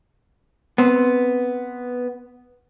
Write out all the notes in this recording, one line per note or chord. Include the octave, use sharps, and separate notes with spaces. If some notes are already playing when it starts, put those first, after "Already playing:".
B3 C4